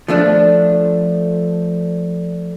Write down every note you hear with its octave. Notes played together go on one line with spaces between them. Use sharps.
F3 A3 D4